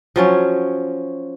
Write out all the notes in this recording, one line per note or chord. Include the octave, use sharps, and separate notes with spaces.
F3 F#3 C#4